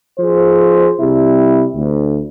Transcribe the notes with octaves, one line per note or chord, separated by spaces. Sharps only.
F3 G#4 C5
C3 G3 E4
D2